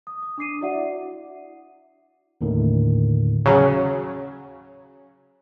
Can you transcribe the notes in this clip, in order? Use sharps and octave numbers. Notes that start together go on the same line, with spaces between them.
D#6
D#6
D4 D6 C7 D#7
E4 F#4 D5 E5 F#5
D#2 A2 D3 D#3
C#3 F#3